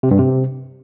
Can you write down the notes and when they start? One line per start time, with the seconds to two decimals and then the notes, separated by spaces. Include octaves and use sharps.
0.03 C3
0.11 G2
0.19 C3